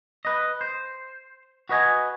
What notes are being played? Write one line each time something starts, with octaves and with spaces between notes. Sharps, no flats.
B4 D#5
C5
F#4 B4 D#5 G#5